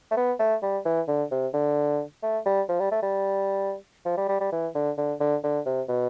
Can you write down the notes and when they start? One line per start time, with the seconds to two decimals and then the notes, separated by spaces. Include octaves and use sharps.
0.11 A3
0.17 B3
0.39 A3
0.62 G3
0.85 E3
1.08 D3
1.31 C3
1.54 D3
2.23 A3
2.46 G3
2.69 F3
2.80 G3
2.92 A3
3.03 G3
4.05 F3
4.18 G3
4.29 G3
4.41 G3
4.52 E3
4.75 D3
4.98 D3
5.20 D3
5.44 D3
5.66 C3
5.89 B2